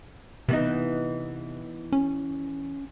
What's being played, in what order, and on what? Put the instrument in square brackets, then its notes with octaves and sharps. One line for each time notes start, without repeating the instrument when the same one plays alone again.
[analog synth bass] C3 [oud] E3 B3 D#4
[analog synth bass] C#4